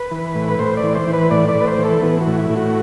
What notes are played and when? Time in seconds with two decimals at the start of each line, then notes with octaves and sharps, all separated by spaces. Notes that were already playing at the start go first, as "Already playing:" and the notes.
Already playing: B4
0.11 E3
0.35 A2
0.48 B4
0.59 A2 C5
0.77 D5
0.83 E3
0.95 C5
1.07 E3
1.13 B4
1.31 A2 D5
1.49 D5
1.55 A2
1.60 B4
1.67 C5
1.78 E3
1.85 A4
2.02 E3 B3
2.21 F#4
2.27 A2
2.38 E4
2.50 A2
2.56 F#4